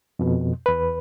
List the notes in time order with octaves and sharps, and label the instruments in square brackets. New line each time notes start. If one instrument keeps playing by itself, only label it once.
[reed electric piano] F2 B2
E2 B4